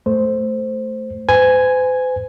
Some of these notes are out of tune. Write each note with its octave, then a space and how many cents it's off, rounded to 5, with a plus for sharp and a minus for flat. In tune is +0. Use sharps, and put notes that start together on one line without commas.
A3 +0 C5 +0
C5 -45 G#5 +0